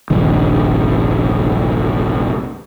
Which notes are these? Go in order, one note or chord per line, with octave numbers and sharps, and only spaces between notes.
F1 A#1 G2 D#3